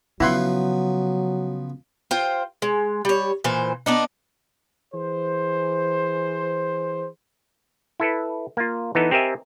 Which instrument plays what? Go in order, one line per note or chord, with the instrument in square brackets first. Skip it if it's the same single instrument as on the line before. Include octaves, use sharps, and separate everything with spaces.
[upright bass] C#3 [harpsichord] F3 B3 [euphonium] F#3 [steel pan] E4 F#5 C6
[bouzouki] F4 C5 G5
G#3
G3 C#5
A#2 E3 C5
B3 D4 D#4
[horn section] E3 G#4 C5
[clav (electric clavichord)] E4 A4 B4
A#3 F4
E3 B3 D#4 A4
C4 G4 A#4 D#5 E5 G#5